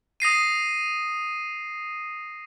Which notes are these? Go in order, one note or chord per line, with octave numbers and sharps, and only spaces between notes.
D#6 A#6 C7 D#7